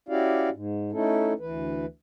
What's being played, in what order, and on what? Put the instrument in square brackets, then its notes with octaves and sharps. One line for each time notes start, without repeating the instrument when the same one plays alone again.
[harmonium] C#4 E4 F#4 G4 D5 F5
G#2
A3 C#4 D#4 E4 A4
D2 E3 B4